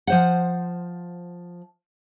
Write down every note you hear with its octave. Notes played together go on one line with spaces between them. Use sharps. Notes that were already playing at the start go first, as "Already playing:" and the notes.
F3 C5 F#5